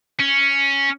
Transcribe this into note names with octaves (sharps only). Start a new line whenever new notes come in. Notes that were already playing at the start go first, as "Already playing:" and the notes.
C#4